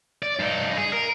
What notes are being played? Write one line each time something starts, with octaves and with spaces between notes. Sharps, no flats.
D5
G2 D#4
G#4
A#4